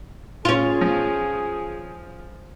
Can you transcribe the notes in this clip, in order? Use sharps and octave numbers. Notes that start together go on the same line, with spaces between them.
C#4 F4 G#4
F3